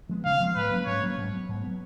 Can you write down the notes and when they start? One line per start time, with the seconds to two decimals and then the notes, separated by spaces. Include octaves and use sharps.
0.09 F3 G#3 B3
0.25 C#3 F5
0.40 F3 G#3 B3
0.56 G#2 B4
0.71 F#3 A#3 C#4
0.86 G#2 C#5
1.02 F#3 A#3 C#4
1.17 G#2
1.33 F#3 B3
1.48 G#2
1.64 F#3 B3